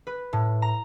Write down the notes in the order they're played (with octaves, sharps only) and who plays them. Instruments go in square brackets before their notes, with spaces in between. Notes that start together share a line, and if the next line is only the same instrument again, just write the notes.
[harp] B4
A2
A#5